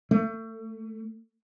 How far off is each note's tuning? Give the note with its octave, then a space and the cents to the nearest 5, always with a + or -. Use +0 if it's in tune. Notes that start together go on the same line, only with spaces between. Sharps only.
A3 +30